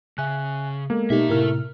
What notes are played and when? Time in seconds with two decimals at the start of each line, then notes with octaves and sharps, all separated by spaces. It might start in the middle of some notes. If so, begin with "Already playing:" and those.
0.18 C#3 E5 G#5 F#6
0.90 G#3 A#3 B3 A4
1.10 B2 A3 D#4 G4 E5
1.30 A2 C3 E4 A#4 F6